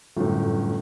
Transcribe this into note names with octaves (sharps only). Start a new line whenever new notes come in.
G1 F#2 A2